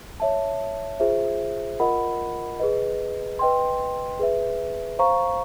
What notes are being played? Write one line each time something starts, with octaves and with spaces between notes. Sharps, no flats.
C#5 E5 A5
F4 G#4 C5 E5
F4 A#4 D#5 F#5 B5
G#4 B4 D#5
B4 D#5 G5 C6
G#4 B4 E5
C5 F5 A#5 C#6